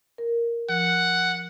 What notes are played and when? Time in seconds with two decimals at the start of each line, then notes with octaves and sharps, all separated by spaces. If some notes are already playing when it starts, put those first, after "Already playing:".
0.18 A#4
0.69 F3 F#5